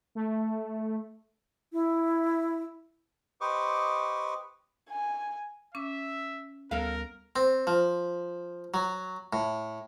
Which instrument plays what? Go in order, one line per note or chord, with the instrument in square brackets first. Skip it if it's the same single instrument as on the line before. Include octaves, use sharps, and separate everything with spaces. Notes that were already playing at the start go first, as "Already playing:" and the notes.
[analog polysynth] A3
[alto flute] E4
[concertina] G4 B4 C5 D#5 C#6 D6
[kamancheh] G#5
[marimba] C#4 D6 [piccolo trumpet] E5
[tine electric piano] D2 G3 B3 [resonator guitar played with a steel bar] F#3 A4 F5 [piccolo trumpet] A#4
[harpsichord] C4
F3
F#3
A2